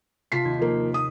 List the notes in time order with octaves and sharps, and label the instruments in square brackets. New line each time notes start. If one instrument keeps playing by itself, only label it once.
[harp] C3 A5 [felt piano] F4 B6 C7
[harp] D#2 G6 G#6
[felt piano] F3 A#3
D#6